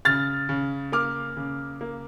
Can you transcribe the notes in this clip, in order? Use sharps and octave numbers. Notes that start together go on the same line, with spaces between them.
C#3 F6 A6
C#3
A#3 D6 F6
C#3
A#3